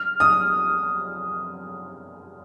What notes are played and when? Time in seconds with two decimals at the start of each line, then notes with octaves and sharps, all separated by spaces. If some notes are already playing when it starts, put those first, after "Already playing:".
Already playing: F6
0.20 D#6